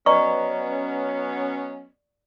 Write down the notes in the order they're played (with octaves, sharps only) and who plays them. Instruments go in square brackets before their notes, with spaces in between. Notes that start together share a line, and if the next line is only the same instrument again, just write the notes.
[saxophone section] F#3 B3 C#4 [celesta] B4 D#5 A#5 [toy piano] D5 C#6